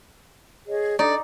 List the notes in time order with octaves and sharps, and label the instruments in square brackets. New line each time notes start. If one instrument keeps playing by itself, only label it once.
[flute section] G#4 C#5 D#5
[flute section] D4 A4 D#5 [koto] D#4 [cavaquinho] D5